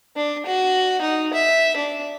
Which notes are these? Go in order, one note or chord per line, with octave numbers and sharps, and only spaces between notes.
D4
F#4
D#4
E5
D4